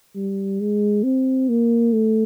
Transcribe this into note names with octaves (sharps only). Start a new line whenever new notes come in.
G3
G#3
C4
A#3
A3